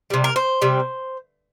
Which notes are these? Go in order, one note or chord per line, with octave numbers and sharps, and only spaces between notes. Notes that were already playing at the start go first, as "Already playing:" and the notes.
C3 G3
A#4
C5
C3 G3